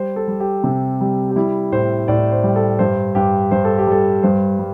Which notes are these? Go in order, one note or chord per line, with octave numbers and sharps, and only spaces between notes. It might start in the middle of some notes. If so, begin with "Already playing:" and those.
Already playing: G3 C5
A4
G3
G4
C3
G3
G4
G3 E4
A2 C5
A2 D5
C5
G3
A4
G2 C5
G2 G4
G2 C5
A4
G4
G3 A4
G2 C5
G3